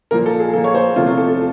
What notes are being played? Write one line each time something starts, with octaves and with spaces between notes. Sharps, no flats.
A#2 F3 A#3 A#4
A4
G#4
A#2 F3 A#3 A4
C#5
C5
E2 C3 F3 A3 F4
F4
A4
A4